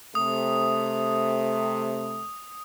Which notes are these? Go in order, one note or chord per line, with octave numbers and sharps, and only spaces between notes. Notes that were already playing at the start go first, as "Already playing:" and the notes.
C3 A3 D#6